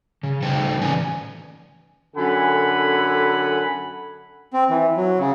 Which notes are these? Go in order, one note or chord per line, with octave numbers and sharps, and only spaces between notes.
C#3
C#3 G3 A3 D#4 C5 G5
A2 E3 C#4 B4 D5 G#5
F#2 D3 A4 F#5 G#5 B5
C4
E3
F#3
C#3